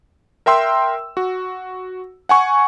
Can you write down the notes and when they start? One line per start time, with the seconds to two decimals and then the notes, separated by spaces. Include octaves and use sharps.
0.46 A#4 E5 G5 C6 E6
1.17 F#4
2.29 F#5 G#5 C#6